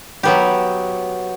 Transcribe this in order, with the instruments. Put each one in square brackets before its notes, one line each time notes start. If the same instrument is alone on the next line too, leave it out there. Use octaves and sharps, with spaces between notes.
[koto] F#3 B3 G4